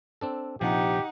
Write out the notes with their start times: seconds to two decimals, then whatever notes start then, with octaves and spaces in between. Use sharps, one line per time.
0.21 C4 D4 A4
0.61 A#1 C3 F3 D#4 G4 F#5